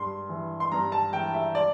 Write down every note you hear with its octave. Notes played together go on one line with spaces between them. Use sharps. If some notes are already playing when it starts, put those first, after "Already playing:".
Already playing: G2 C6
E3
C6
G2 A#5
A5
E3 G5
E5
D5